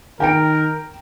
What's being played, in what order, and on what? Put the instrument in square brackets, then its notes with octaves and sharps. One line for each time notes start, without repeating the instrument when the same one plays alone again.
[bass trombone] D#3 [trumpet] A#4 [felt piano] G5 A#5 D7